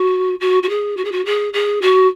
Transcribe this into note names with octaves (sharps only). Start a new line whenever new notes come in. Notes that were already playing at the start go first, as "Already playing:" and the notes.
Already playing: F#4
F#4
F#4
G#4
F#4
G#4
F#4
G#4
G#4
F#4